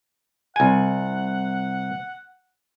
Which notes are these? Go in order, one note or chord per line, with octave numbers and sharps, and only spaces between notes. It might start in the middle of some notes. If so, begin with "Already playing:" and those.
C2 F#5 G#5